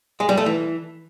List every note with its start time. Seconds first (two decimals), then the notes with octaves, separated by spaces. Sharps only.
0.20 G#3
0.29 G3
0.37 A3
0.46 E3